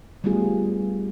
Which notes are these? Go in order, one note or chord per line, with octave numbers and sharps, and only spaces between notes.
G3 A3 B3 F4 G#4